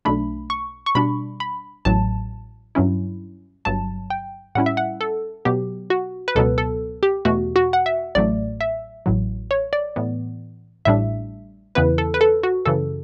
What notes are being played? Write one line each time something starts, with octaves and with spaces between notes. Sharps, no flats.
B1 B2 A3 D4 B5
C#6
C#6
B2 G3 D4 B5
B5
A1 A2 F#3 A5
G2 F#3 C#4 E4
G1 G2 F#3 A5
G5
A2 G3 C#4 E4 F#5
E5
F#5
A4
B2 F#3 B3 G4
F#4
B4
C#2 B2 F#3 B3 A4
A4
G4
E2 B2 A3 F#4
F#4
F#5
E5
A1 A2 F#3 A3 D5
E5
A1 A2 F#3
C#5
D5
A2 E3 B3
A1 A2 G3 D4 E5
E2 C#3 E3 B3 E4 B4
A4
B4
A4
F#4
F#2 C#3 E3 A4